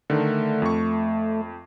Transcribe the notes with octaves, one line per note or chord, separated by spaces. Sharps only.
D3 D#3 A3
F2 C#6